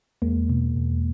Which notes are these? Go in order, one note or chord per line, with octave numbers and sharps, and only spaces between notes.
E2 G#3 A#3
B2
E2